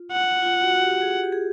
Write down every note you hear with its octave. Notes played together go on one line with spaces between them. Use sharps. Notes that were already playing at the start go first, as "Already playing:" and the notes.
Already playing: F4
F#5
F4
F#4
G4
G#4
G4
G#4